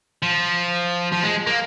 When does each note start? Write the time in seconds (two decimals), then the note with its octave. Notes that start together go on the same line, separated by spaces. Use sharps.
0.23 F3
1.12 F3
1.23 G#3
1.47 A#3